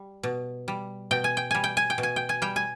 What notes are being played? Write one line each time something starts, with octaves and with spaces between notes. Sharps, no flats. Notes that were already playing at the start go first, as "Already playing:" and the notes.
Already playing: G3
B2
G3
B2 G5
G#5
G5
G3 G#5
G5
G#5
G5
B2
G#5
G5
G#5
G3 G5
G#5